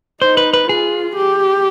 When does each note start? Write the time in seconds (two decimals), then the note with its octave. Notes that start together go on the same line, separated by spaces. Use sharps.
0.22 D#4 C5
0.37 B4
0.53 B4
0.69 F4 G#4
1.17 G4